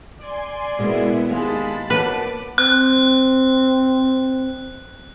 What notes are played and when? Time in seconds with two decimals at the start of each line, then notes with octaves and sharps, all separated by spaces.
0.20 D5 G#5 C6
0.79 B2 G#3 A#3 B3 E4
1.30 D#2 G#3 D#5 F5 A5 B5 A6
1.90 B2 A#3 B4 C#5 F#5 A5 D6
2.58 C4 F#6